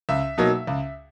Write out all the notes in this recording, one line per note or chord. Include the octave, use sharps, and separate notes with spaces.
C#2 E5
B2 F#3 A#3 D#4
C#2